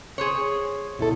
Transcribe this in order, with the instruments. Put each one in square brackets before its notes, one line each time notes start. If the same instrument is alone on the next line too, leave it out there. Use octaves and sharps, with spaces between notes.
[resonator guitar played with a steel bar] G#4 C5 C#5
[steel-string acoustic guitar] B2 E4 A4